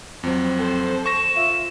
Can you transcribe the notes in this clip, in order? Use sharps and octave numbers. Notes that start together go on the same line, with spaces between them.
F2 F#3 C4
A4 C5
C#6 A#6 E7
F4 E5 E7